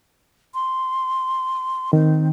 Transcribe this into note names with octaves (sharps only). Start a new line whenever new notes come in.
C6
D#3 C4